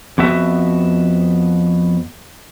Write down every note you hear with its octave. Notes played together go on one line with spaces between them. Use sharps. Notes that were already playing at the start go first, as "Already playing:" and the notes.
F2 B3 F#4 E5